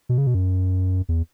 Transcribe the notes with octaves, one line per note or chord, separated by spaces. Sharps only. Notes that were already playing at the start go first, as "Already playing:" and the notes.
B2
C#3
B2
F#2
E2